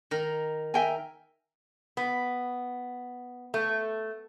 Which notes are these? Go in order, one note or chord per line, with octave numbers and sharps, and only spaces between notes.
D#3 A#4
A#4 E5 G5 G#5
B3
A3